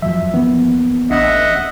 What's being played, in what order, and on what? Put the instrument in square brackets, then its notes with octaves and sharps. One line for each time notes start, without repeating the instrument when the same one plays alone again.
[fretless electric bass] F2 F3 F#3 [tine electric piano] E5
[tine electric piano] E3 A#3 B3
[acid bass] A1 [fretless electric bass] D4 [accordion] D#5 E5 F#5